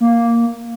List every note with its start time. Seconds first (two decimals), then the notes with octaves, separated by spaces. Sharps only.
0.01 A#3